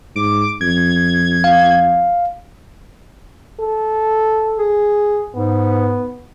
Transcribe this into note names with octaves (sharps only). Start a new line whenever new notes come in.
G#2 D6
F2 G#6
F5
A4
G#4
G#2 B3